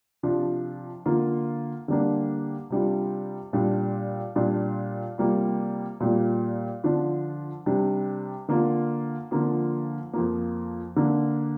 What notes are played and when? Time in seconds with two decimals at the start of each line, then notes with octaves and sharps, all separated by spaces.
0.23 C3 F3 D4 F4
1.06 D3 A#3 F4
1.88 D3 G3 A#3 D4
2.70 C3 G3 D4 F4
3.53 A#2 G3 D4 F4
4.36 A#2 G3 D4 F4
5.18 C3 G3 A#3 F4
6.00 A#2 G3 A#3
6.84 D3 F3 D4 F4
7.66 C3 G3 D4
8.49 D3 A#3 F4
9.31 D3 F3 A#3 F4
10.13 F2 F3 A#3
10.96 D3 A#3 D4